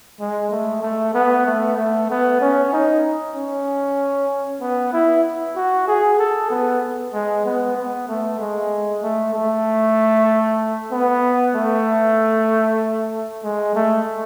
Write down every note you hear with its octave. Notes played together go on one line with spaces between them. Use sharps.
G#3
A3
A3
B3
A3
A3
B3
C#4
D#4
C#4
B3
E4
F#4
G#4
A4
B3
G#3
B3
B3
A3
G#3
A3
A3
B3
A3
G#3
A3